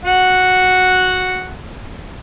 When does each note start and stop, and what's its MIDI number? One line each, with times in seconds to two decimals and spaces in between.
0.05 1.51 66
0.05 1.51 78